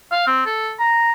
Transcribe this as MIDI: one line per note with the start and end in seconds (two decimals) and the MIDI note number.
0.11 0.23 77
0.27 0.42 60
0.46 0.72 69
0.79 1.13 82